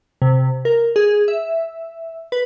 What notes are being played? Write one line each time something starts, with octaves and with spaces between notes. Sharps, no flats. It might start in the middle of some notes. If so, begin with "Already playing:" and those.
C3
A#4
G#4
E5
B4